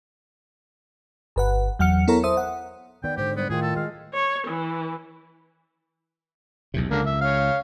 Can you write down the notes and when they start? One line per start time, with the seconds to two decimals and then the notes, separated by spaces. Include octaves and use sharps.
1.36 G1 B4 F#5
1.79 E2 F#3 F#5 F6 C#7
2.08 B3 E4 A4 A#4 C#5 A#5
2.24 A4 C5 E5 D#6
2.37 F#5
3.04 D#3 B3 D5 G5
3.17 G#2 D3 G4 C5
3.37 G3 B3 C5
3.50 A2 D#3 F4 G#4
3.62 A4
3.76 G#3 F5
4.14 C#5
4.47 E3
6.74 B1 E2 C3
6.91 C#2 D3 A#3
7.06 E5
7.21 C#5 F5